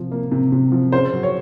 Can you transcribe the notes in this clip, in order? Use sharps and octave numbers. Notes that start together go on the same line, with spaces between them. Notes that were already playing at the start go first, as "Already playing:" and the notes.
Already playing: C3 F3
A#3
C3
C3
F3
C#3 C5
F#3
C#5